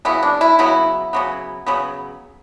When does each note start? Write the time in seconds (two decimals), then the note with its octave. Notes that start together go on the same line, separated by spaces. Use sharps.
0.05 C#3 F#3 B3 E4
0.23 D4
0.41 E4
0.59 C#3 F#3 B3 E4
1.13 C#3 F#3 B3
1.67 C#3 F#3 B3